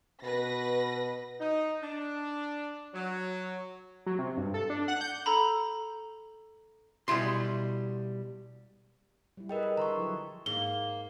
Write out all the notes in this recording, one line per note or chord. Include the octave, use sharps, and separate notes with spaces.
B2 B4 A#6
D#4
D4
F#3
F#3
C3
G2
A4
D4
F#5
G6
A4 A#5 B5
B2 G3 E4 C6
G3 E4
G#4 A#4 B4 D#5 G5
A#4
D3 A4 B4 A#5 C6 C#6
F3 F#3 E4
G#2 A#3 G7